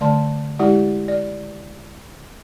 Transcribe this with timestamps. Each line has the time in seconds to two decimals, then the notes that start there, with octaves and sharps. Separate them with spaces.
0.01 D3 A3 D5 A5 C6
0.59 G#3 E4 G4 D5 F#5
1.08 D5